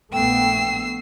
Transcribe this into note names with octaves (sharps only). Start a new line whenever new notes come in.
A#1 A3 B3 G5 E6 C7